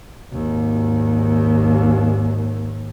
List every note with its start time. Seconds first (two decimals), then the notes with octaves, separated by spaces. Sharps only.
0.33 G#1 D#2